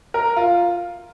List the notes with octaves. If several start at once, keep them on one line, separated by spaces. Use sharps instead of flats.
A#4
F4